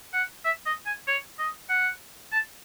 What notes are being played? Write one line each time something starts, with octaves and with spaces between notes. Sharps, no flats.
F#5
E5
D#5
G#5
C#5
D#5
F#5
A5